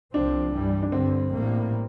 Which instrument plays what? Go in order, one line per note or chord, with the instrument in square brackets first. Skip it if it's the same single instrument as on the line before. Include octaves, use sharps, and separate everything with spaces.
[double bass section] C2 C3 F3 C4 [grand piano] D4
[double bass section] G2 E3 G3
[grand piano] D4
[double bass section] G2 D3 G3 [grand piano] C4
[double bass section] A1 A2 G3 A#3